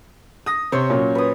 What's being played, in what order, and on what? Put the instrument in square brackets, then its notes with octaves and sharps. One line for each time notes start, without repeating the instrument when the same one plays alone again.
[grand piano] D#6 A#6
[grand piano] C3 [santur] C5 C#5
[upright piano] A#2 F#3 [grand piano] C#4
[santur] B4 D#6